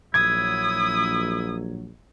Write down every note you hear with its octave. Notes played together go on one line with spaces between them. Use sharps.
A#1 F#3 E4 D#6 G#6